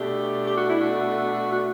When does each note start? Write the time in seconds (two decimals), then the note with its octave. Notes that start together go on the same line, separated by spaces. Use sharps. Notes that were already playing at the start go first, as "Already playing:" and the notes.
Already playing: B2 A3 D4 G4
0.45 G4
0.57 F#4
0.69 E4
0.81 F#4
1.53 F#4